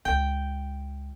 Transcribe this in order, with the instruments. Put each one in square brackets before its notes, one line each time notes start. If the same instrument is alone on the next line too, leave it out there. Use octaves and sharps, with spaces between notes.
[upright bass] C#2 [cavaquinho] G5